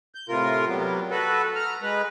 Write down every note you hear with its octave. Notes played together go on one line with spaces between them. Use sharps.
G6
A2 C3 F4 A#4
F#3 G3 B3
F#4 A4 B4
A#5 F6
G#3 B4